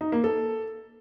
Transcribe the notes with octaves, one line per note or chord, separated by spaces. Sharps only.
D#4
A#3
A4